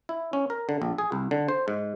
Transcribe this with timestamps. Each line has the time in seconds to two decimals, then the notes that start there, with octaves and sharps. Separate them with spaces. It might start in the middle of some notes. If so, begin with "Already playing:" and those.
0.09 E4
0.33 C#4
0.50 A#4
0.69 D3
0.82 A#1
0.98 G#4
1.12 C2
1.31 D3
1.48 C5
1.68 G#2